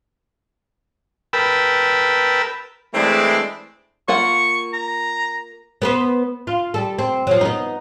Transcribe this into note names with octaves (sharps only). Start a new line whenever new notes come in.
A#4 B4 G5 A5 B5 E6
E3 G#3 A3 C4 D4 E4
A#3 F4 F#5 C#6
A#5
B3 B4 C5
F4
G3 A4
C4
F3 F#3
B3 D#4